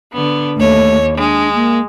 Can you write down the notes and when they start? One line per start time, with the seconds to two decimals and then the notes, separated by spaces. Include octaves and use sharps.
0.12 D3 B3
0.57 D#2 A3 C#5
1.16 G#3 D4
1.54 A#3